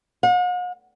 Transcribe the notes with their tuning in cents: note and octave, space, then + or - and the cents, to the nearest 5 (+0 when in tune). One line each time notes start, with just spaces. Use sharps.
F#5 -45